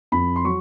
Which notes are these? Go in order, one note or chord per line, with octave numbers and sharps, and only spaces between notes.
F2 B5
C6
F#3 C#6